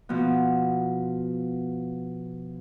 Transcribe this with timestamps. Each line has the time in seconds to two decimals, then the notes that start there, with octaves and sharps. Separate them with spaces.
0.09 B2 F3 B3